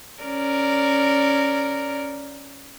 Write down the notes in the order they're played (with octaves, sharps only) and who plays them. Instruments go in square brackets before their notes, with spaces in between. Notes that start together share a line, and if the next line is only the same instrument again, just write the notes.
[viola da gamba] C#4 A#4 D5